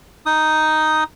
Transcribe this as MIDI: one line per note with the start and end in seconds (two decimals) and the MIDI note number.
0.26 1.04 63
0.26 1.04 87